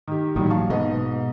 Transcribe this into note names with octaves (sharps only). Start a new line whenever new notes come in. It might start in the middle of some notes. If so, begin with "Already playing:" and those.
D#3 G4
A1 A#2 D#3 F#3 G3
F5 A5 C#6
G#2 B2 B3 D#5